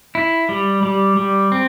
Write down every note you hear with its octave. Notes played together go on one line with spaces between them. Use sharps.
E4
G3
G3
G3
C4